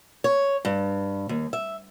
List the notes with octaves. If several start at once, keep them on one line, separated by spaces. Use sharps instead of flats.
C#5
G2
D#2
E5